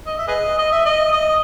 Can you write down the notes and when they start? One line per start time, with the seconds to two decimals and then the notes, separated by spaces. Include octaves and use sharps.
0.06 D#5
0.18 E5
0.28 G#4 B4 D#5
0.58 D#5
0.72 E5
0.85 D#5
1.12 D#5